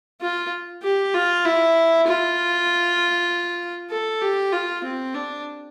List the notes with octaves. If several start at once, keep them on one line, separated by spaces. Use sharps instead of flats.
F4
G4
F4
E4
F4
A4
G4
F4
C4
D4